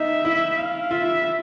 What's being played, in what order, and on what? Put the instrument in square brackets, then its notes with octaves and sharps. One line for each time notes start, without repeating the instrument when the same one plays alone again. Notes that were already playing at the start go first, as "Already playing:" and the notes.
Already playing: [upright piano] D#4 [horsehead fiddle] E5
[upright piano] E4
[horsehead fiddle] F5
[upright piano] F4 [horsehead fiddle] E5